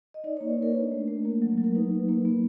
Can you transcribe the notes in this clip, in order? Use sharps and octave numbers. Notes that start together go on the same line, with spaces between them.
D#5
D#4 D5
C#5
A#3
B4
A#3 A#4
D4 A#4
A3
A3
A#3
F#3
F#3
A#4
D#4 B4
A#3
A#3
B3